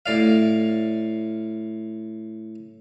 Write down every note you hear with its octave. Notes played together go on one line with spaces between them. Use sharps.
A2 D5 F5